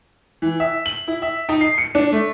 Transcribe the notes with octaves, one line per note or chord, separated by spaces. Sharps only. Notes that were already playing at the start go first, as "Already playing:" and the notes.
E3
E5
F#7
E4
E5
D#4
C7
C#7
D4
A3